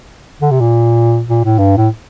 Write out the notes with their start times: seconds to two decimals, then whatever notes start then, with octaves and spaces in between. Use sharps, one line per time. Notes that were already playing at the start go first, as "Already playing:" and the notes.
0.41 D3
0.51 C3
0.60 A#2
1.29 A#2
1.44 A2
1.59 G2
1.77 A2